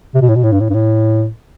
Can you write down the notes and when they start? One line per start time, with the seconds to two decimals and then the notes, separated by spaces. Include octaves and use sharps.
0.14 C3
0.21 B2
0.29 A2
0.36 B2
0.43 A2
0.52 G2
0.60 A2
0.70 G2
0.74 A2